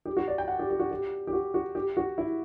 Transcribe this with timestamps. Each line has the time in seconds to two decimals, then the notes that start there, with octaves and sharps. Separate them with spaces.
0.05 G4
0.17 F#4
0.28 D5
0.38 G5
0.48 F#5
0.59 G4
0.70 G4
0.79 F#4
0.91 G4
1.27 G4
1.33 F#4
1.54 F#4
1.75 G4
1.97 F#4
2.18 E4